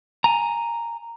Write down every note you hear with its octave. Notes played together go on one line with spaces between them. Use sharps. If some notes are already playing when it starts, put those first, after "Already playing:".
G#5 A#5